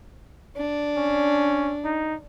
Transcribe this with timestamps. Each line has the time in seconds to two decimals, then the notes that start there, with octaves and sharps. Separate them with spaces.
0.57 D4
0.97 C#4
1.85 D#4